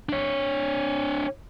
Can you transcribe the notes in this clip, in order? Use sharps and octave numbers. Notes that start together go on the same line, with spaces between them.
D4 C#5